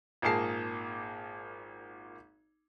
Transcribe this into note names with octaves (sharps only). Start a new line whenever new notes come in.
G#1 A#2 A#3 G#4 A5 C7